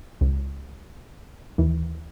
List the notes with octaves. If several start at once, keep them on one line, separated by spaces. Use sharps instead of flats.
C#2
D#2 E3